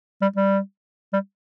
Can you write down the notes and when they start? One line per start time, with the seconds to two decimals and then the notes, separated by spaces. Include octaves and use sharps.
0.21 G3
0.36 G3
1.13 G3